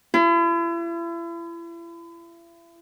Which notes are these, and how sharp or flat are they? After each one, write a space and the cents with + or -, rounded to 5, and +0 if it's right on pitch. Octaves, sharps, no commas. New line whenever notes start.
E4 +40